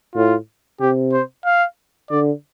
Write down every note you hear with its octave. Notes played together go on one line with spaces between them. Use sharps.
A2 F4
C3 G4
C5
F5
D3 D5